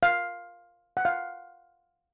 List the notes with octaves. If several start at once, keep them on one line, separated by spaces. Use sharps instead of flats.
F5
F#5
F5